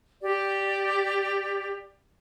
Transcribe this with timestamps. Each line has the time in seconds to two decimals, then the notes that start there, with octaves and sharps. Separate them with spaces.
0.22 G4 D5